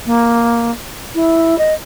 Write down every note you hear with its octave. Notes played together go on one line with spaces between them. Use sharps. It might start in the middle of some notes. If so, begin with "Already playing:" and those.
A#3
E4
D#5